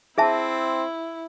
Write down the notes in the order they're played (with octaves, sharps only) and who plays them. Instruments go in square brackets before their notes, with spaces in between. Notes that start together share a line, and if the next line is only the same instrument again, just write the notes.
[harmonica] C4 [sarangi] E4 [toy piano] G#4 E5 A5